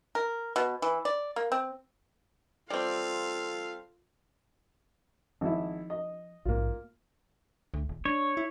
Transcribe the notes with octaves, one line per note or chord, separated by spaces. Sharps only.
A#4
B2
E3
D5
A#3
C4
G3 C4 F4 A4 F5
G#1 F3 E4
D#5
A#1 G#2 A#3 F4
D2
D#1
D4 C#5
E4